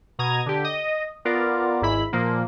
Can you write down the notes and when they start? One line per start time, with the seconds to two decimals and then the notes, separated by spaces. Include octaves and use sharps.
0.19 B2 A#5 D#6 G#6
0.46 D3 G4
0.64 D#5
1.25 B3 F4 A#4 D5
1.81 G#1 G#2 E4 B5
2.13 A#2 F3 A#3